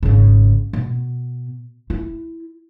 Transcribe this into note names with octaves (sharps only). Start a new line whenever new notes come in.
G#1 C#3
B2
E4